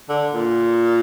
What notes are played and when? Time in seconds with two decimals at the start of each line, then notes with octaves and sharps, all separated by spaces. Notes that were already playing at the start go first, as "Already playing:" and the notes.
0.09 D3
0.33 A#2